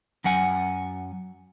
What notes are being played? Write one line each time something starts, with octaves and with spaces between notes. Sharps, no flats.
F#2 F#3 F#5 G#5